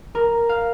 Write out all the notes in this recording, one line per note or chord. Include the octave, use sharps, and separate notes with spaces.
A#4
F5